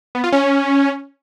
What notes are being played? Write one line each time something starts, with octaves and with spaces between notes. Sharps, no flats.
B3
F4
C#4